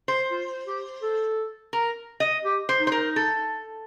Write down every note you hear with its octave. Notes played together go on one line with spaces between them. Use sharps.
C5
F4
G4
A4
A#4
D#5
G4
C5
D#4
C5
A#4
A4